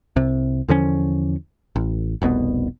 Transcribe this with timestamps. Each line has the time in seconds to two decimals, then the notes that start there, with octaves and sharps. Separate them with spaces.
0.16 C2 C3
0.68 E2 D3 F3 C#4
1.76 A1
2.22 F1 C2 B2 B3